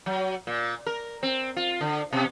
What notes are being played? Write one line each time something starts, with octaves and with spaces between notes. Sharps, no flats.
F#3
A#2
A#4
C4
F4
D3
B2